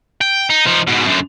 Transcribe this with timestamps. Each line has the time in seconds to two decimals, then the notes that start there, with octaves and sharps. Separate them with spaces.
0.21 G5
0.50 D#4
0.66 F3 D#4
0.87 G#2 B2
1.06 F#2 D3